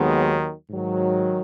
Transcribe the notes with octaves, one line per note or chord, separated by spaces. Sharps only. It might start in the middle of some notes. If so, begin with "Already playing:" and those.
Already playing: D#2 D#3 F#3 G#3 B3
G#2 D#3 F#3